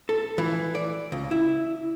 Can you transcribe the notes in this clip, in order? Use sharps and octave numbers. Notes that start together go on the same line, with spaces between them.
A4
E3
D5
C#2
E4